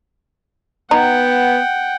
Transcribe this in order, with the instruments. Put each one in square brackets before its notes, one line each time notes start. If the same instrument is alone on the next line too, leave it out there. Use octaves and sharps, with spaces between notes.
[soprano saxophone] B3 [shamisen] D#4 [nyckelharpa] F#5 G5